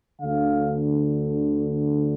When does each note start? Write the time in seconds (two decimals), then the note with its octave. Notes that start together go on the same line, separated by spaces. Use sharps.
0.21 D2 D3 F5